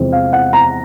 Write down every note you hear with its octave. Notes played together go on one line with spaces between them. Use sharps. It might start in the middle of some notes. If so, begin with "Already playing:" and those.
Already playing: E2 C3 F3 G#3 C4
F5
F#5
A#5